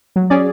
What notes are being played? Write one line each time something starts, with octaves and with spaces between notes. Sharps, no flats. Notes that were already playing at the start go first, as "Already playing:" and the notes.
F#3
C#4 G#4 D5